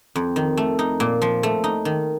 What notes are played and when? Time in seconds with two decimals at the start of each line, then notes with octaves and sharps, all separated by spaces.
0.15 F2
0.36 D#3
0.57 A3
0.79 D#4
1.00 A#2
1.22 F3
1.43 A3
1.64 D#4
1.85 D#3